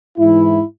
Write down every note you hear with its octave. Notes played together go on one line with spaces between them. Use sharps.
G#2 E3 E4